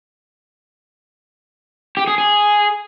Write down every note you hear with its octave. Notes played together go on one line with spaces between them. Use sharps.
G4
G#4
G#4